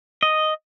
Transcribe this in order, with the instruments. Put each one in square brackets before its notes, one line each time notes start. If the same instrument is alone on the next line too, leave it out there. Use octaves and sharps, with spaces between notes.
[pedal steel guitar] D#5